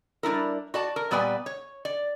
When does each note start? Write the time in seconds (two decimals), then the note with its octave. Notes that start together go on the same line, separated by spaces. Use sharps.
0.23 G3 D4 E4 A#4
0.74 F#4 D5 A5
0.96 A#4
1.11 A#2 G3 B3 B4 D5 G#5
1.46 C#5
1.85 D5